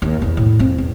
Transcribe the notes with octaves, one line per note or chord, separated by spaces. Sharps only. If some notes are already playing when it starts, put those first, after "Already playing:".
D#2
E2
A2
F2 C4
E2